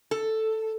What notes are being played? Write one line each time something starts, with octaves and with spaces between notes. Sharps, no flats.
A4